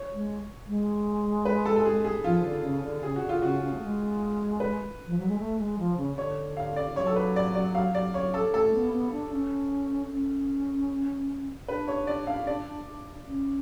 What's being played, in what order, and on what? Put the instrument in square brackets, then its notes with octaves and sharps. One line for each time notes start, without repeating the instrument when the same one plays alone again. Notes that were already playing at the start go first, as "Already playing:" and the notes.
Already playing: [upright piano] C#5
[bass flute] G#3
G#3
[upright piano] B4
A4
A4
G#4
G#4
[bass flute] F3 [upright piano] F4
[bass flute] D3
C#3
D3
[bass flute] C#3 [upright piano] G#4
[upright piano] F#4
[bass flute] D3
[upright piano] F4
[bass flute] C#3 [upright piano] F#4
[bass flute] C#3
A3
G#3
[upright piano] B4
[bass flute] F3
F#3
G#3
A3
G#3
F3
C#3
[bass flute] D3 [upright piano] C#5
[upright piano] F5
D5
[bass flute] F#3 [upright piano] C#5
[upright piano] A4
B4
D5
D5
F5
D5
C#5
A4
[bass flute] A3 [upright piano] A4
[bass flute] B3
B3
D4
C#4
C#4
[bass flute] D4 [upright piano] B4
[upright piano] C#5
D5
F5
D5
[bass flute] C#4